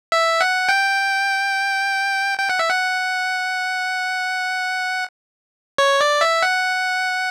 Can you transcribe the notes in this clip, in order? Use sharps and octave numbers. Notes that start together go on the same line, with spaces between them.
E5
F#5
G5
G5
F#5
E5
F#5
C#5
D5
E5
F#5